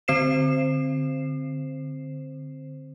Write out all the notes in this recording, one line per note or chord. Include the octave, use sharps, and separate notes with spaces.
D3 C4 C5 C7 E7